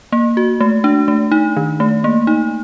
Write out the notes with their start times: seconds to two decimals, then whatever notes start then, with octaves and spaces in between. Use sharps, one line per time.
0.12 A#3
0.37 F#4
0.61 A3
0.84 D4
1.08 A3
1.32 D#4
1.57 D#3
1.80 A3
2.04 A#3
2.27 D#4